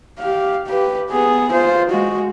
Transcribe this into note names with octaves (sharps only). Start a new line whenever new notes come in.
G4 F5
G4 B4
B3 G#4
F4 C5
G#3 F#4